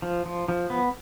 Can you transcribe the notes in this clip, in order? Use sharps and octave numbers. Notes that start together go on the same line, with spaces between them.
F3
F3
F3
B3